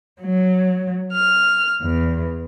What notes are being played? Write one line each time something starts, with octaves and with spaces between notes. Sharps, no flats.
F#3
F6
E2